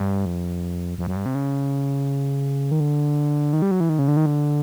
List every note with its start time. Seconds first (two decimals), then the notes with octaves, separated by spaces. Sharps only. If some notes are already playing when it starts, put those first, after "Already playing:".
Already playing: G2
0.26 F2
0.98 F2
1.07 F#2
1.16 G2
1.26 C3
1.35 C#3
2.71 D#3
2.80 D3
3.53 D#3
3.62 G3
3.71 F#3
3.80 E3
3.89 D#3
3.99 C#3
4.08 D3
4.17 D#3
4.26 D3